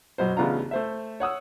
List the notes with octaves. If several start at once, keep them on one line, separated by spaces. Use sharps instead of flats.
F#2 B2 C5
A1 C#3 B3 D4 F4 A#5
A3 C5 E5
C#5 F#5 D#6 E6